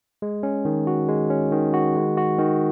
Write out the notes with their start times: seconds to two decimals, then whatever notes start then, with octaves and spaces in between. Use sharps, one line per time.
0.22 G#3
0.43 C#4
0.65 D#3
0.87 F#4
1.08 G#3
1.30 C#4
1.52 D#3
1.74 F#4
1.96 G#3
2.18 F#4
2.39 D#3